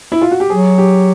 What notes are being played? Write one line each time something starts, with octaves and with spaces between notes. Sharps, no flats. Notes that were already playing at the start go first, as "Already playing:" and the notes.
E4
F4
F#4
G4
F#3 G#4
G4